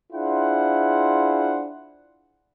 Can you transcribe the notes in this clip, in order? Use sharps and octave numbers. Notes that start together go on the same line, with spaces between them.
D4 E4 F4 G#4 C5 F#5